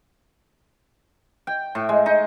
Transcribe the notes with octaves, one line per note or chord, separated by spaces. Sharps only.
G5
A2
G#3
D#4